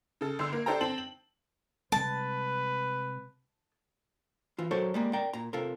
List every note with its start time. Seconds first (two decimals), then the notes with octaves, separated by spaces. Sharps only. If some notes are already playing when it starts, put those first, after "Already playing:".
0.21 C#3 A4
0.39 G1 D3 C6 E6
0.53 A#3
0.66 D4 G4 A4 C5 G5 A#5
0.81 C4 A5 F#7
0.98 F#7
1.92 C3 G3 G#3 B4 A5
4.58 E3 F4
4.71 F#3 A4 A#4 C5 C#5
4.94 G3 G#3 A#3
5.13 A#4 D5 G5
5.33 A#2 A#5
5.53 C3 F4 A4 A#4